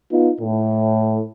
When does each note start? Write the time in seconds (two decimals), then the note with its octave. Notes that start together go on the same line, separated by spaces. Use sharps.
0.12 B3 D#4 F4
0.41 A2